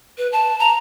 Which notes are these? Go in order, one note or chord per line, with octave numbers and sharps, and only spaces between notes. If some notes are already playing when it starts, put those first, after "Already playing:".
B4
A5
A#5